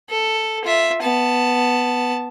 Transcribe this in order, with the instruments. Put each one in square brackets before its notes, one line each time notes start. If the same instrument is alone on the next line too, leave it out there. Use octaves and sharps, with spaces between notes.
[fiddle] A4
F4 E5
B3 A5